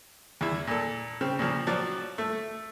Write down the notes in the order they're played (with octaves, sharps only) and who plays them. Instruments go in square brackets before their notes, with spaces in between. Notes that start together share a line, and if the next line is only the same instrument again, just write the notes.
[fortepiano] E2 E4
A#2 A4
C#3 C4
A#2 C#3 F3
F3 F#3 D5
A3